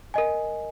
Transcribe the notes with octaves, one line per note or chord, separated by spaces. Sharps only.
A#4 D#5 G#5